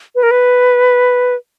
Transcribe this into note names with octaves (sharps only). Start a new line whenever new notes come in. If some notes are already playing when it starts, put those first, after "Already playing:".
B4
A#4
B4